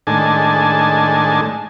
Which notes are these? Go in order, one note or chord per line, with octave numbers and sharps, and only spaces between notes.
A2 D#3 G#3 D4 G#5 A5